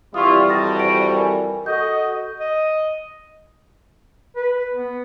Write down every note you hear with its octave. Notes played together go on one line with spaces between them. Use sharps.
F2 E3 G3 E4 F4 C#6 D#6
F#4 A4 D#6 A6 A#6
C5 D7
A#4 G#5
F#4 A4 D#5 G6
D#5
B4
B3